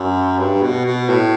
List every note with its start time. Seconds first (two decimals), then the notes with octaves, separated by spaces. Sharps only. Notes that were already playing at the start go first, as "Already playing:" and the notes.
Already playing: F#2
0.39 G2
0.62 B2
0.85 B2
1.09 A2